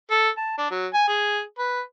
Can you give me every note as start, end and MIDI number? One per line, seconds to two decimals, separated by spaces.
0.11 0.29 69
0.37 0.57 81
0.58 0.68 62
0.70 0.87 54
0.94 1.03 80
1.08 1.40 68
1.58 1.81 71